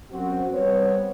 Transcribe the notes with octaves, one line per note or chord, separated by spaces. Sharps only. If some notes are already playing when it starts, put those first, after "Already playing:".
F#2 C4 F#4
G3 B3 C4 C#5